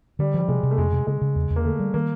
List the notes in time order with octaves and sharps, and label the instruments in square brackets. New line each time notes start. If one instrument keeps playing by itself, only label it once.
[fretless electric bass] D3 [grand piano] G3
[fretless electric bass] F3 [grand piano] G3
[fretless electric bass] C3 [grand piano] G#3
[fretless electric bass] C3
[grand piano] A3
[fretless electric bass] F2 [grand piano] G#3
[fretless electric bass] C3
[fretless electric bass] C#3 [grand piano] G#3
[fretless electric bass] C#3
E2
E2
[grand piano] A#3
[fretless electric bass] D3 [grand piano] A3
[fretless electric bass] G3
[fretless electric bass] D#3 [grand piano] A#3